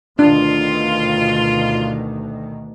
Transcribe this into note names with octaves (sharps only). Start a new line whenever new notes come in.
D2 B2 D#3 D4 F4